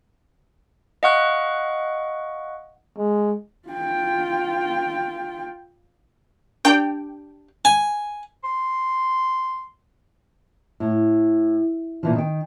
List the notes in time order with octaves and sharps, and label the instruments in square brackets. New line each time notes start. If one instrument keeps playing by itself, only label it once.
[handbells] D#5 F5 F#5 C#6 F#6
[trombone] G#3
[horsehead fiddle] F4 G5
[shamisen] D4 G4 D5 [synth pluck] G5
[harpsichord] G#5
[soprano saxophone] C6
[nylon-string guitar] A2
A#2 E3 F3
D#3 G5